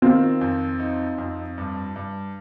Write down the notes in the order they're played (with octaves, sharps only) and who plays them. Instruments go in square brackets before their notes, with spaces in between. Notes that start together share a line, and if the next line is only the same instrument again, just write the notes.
[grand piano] D#3 [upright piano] C4 F4
[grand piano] F2
D#4
F2
G2
G2